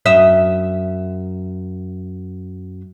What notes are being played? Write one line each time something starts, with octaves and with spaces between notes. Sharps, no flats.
F#2 D#5 E5